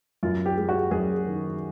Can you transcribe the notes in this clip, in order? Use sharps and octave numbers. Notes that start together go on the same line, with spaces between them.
F#2 F4
G4
G#3
F#4
F#2 G#4
D#3